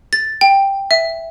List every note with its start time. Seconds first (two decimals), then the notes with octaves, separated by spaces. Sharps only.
0.13 A6
0.41 G5
0.91 E5